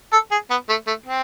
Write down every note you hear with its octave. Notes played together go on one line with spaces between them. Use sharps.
A4
G#4
B3
A3
A3
C4